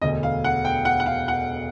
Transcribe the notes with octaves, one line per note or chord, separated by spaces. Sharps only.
E1 D2 D3 D#5
F5
F#5
G5
F#5
F#5
F5
F#5